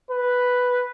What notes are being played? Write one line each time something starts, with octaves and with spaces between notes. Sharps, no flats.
B4